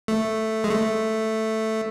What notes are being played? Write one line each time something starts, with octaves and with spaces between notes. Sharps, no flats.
A3
G#3
A3